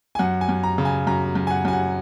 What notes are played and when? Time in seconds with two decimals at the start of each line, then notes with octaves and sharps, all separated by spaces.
0.15 G#5
0.19 F#2 F#5
0.41 G#5
0.49 F#2
0.63 A#5
0.78 C#3
0.85 G#5
1.07 F#2 A#5
1.35 F#2
1.47 G#5
1.51 F#5
1.65 F#2 G#5
1.73 F#5